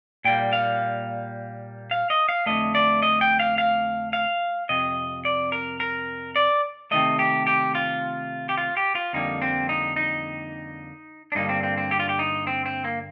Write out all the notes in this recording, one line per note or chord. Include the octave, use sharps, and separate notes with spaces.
A#2 G3 A#3 G5
F5
F5
D#5
F5
F2 D3 F3 A3 D#5
D5
D#5
G5
F5
F5
F5
F2 C3 D#5
D5
A#4
A#4
D5
C3 D#3 A3 D#5
G4
G4
F4
G4
F4
G4
F4
F2 D3 G3 A#3 D#4
C4
D#4
D#4
D4
G2 D3 G3 A#3 D#4
C4
C4
C4
G4
F4
G4
D#4
C4
C4
A#3